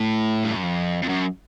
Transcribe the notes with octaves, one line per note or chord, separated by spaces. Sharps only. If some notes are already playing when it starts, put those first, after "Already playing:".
Already playing: A2
G2
F#2
F2
F2
F#2